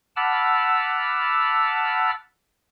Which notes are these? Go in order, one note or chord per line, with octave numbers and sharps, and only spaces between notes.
F#5 A5 B5 D6 E6 F6